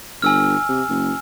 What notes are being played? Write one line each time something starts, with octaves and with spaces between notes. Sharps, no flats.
G1 G#5 E6 F6
C3
F#1